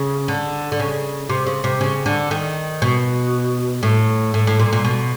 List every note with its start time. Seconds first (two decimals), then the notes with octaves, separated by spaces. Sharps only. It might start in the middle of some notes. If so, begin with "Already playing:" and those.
Already playing: C#3
0.28 D3
0.72 D3
0.80 C#3
1.29 C3
1.46 C#3
1.64 C3
1.81 C#3
2.06 D3
2.31 D#3
2.82 B2
3.83 A2
4.34 A2
4.47 A2
4.59 A#2
4.73 A#2
4.84 B2